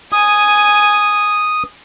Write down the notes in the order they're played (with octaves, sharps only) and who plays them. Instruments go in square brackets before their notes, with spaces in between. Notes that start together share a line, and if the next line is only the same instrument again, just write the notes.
[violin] G#5 [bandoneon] D#6